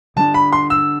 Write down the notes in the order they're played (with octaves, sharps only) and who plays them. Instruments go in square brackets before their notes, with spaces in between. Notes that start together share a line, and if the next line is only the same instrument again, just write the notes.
[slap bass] D3 G3 B3 D4 [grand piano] A5
[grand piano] B5
C6
E6